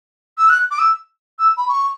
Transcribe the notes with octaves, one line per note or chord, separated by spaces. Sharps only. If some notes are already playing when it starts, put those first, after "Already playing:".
E6
F#6
D6
E6
E6
B5
C#6